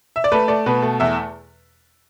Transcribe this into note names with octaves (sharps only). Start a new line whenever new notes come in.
E5
D5
A3 B4
A3 D5
B2 B4
A3
E2 E5